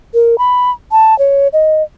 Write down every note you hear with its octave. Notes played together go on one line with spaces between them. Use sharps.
A#4
B5
A5
C#5
D#5